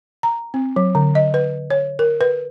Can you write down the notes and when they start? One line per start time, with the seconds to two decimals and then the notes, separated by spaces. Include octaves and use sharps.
0.23 A#5
0.54 C4
0.76 F#3
0.95 D3
1.15 D#5
1.34 B4
1.70 C#5
1.99 A#4
2.21 B4